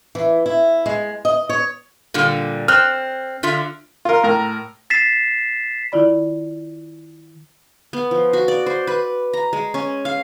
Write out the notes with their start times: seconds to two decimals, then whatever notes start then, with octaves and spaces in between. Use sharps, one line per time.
0.15 E3
0.46 E4
0.86 G#3
1.25 D#5
1.49 C#5
2.14 A#2 D3 G3
2.68 C4 F6 F#6
3.43 D3 F4 E5
4.05 F4 A#4
4.23 A2 A#4
4.90 A6 B6 C7 E7
5.92 D#3 E4 F4 D5 B5
7.93 B3
8.11 F3
8.33 F#4
8.48 D5
8.66 C5
8.87 B4
9.33 A#5
9.53 G#3
9.74 C#4
10.05 F5